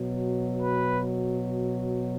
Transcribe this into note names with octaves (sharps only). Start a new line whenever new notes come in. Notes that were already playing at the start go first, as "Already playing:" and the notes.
Already playing: B2 F#3
B4